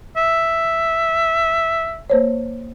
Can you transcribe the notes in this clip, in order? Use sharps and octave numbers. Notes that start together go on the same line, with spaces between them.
E5
A#3 C5 C#5